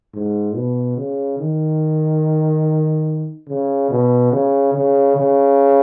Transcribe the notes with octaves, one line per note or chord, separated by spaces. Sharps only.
G#2
B2
C#3
D#3
C#3
B2
C#3
C#3
C#3